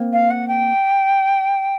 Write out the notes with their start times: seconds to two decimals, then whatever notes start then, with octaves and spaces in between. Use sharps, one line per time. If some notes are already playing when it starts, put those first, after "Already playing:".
Already playing: A#3 C4
0.13 F5
0.30 F#5
0.48 G5